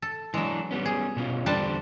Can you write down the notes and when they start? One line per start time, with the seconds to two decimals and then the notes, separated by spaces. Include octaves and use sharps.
0.02 A4
0.34 E3 F#3 G#3 D4
0.71 G3 B3 C#4
0.85 G#4
1.17 B2 C#4 F4
1.46 E2 D3 G3 D4 C5 A5